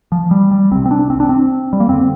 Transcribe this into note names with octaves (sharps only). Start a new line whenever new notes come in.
F3
G3
G3
C2 C3 C4
C4
D4
C4
D4
C4
G3
A#3
F2 D3 C4